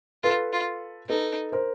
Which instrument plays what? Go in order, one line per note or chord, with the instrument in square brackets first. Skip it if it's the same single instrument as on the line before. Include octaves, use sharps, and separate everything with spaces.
[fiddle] F4 [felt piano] A4 B4
[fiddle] F4
[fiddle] D#4 [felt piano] A4 B4
[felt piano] A#4 C5